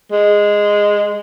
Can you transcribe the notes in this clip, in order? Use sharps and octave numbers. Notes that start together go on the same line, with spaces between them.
G#3